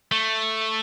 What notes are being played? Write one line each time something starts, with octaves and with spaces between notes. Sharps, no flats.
A3